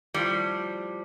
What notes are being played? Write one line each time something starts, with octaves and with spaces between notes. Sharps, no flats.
A2 F3 G3